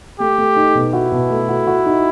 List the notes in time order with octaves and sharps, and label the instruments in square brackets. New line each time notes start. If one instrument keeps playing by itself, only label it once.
[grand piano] A3 [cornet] G4
[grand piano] A3
D#4
B2
[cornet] E4 [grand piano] F#4
[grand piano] B2
A3
F#4
F#4
D#4